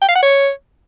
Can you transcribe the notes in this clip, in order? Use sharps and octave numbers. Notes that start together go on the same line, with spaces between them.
G5
F5
F#5
C#5